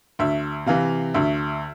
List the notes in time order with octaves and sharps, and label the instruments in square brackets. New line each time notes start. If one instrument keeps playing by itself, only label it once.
[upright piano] D2 E5
C3 E3 F5
D2 E5